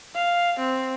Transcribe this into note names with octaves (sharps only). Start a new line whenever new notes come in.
F5
C4